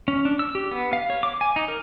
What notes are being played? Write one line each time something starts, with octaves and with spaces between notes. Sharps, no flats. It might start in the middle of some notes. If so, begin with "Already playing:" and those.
C#4
D4
E6
G4
B3
F5
C#5
D6
G#5
D#4
A#4